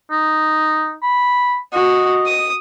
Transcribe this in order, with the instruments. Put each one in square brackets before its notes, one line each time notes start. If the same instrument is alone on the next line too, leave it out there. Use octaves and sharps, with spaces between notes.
[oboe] D#4
B5
[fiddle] F#4 [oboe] D#5
[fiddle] D#6